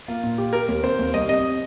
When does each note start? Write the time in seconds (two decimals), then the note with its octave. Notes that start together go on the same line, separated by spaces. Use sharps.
0.08 A#3 F4
0.23 A#2
0.38 G4
0.53 G4 A#4
0.68 D#2
0.83 C4 C5
0.99 D#2
1.14 C2 D#5
1.29 C3 D#5